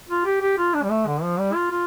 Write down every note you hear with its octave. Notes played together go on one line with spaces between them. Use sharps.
F4
G4
G4
F4
D4
G3
A3
D3
F3
G3
F4
F4